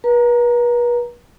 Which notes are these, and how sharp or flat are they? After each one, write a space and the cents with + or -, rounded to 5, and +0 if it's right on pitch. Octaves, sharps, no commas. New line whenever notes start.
B4 -40 A#5 +0